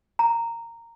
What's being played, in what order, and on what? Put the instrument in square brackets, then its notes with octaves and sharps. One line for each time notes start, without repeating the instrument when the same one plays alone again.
[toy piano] A#5